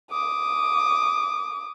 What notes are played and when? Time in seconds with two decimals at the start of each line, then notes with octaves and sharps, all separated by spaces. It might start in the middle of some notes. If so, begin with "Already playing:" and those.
0.11 D6 D#6